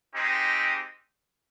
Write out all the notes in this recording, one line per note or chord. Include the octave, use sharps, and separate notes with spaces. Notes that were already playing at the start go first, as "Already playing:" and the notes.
G#3 C4 D#4 G4